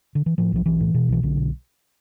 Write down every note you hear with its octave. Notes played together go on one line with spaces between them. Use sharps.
D3
E3
A2 F3
B1 F3
B1 E3
A2
B2
B1 E3
B1 D3
B2